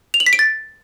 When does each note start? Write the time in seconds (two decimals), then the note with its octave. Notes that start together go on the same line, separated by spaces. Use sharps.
0.14 F7
0.20 F#7
0.26 B6
0.33 D7
0.39 A6